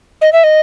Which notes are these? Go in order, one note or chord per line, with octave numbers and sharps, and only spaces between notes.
D#5
E5
D#5